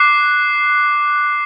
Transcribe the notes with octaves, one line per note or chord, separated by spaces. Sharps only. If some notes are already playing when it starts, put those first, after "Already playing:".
Already playing: D6 F#6 C7